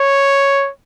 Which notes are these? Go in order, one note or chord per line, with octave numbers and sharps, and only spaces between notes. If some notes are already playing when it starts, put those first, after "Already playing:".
Already playing: C#5